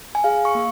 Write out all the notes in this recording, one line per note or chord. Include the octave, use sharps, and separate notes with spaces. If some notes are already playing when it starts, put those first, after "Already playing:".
G#5
G#4 F5
C#6
A#3